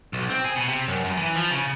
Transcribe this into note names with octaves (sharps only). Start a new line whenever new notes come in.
B1
C4
G#4
B2
C3
F#2
F#2
E3
F3
C#3